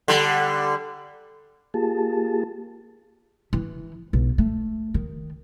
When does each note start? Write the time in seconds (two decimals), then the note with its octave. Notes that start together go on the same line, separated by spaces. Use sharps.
0.08 D3 G3
1.74 A#3 F4 G4 G#4 A5
3.53 E3
4.13 B1
4.38 A3
4.94 D#3